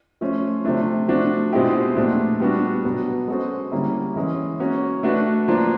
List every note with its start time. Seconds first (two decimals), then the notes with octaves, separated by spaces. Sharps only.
0.21 F3 A3 C#4 F4
0.65 C3 F3 A3 D4
1.08 F3 A3 D4 F#4
1.53 B2 G#3 C4 E4 G4
1.97 A#2 F3 A3 D4
2.40 G3 B3 D4 F#4
2.85 B2 F#3 B3
3.28 G#3 C#4 F#4 A4 C5
3.71 D3 G3 A#3 C#4 E4
4.16 E3 G#3 C#4
4.60 A#3 C#4 F#4
5.03 A3 D4 F#4 B4
5.48 F3 A#3 D4 F4